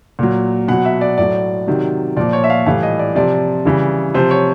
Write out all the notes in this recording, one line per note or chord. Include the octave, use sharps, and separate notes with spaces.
A#2 F#3
B2 F#3 F#5
E5
D5
A2 F#3 D5
C3 D#3 F#3
A#2 F3 D5
C#5
E5
F5
A2 E3 G3 F5
D#5
D5
C3 F3 D5
C#3 E3 G3
C3 F3 C5
C#5